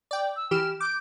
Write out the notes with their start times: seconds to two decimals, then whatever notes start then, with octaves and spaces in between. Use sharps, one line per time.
0.11 D5 G5
0.36 E6
0.51 E3 G4 F6 E7
0.80 D6 G6